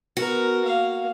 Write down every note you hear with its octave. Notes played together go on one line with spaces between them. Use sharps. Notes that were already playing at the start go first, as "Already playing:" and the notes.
B3 F#4 A#4
A#3 F5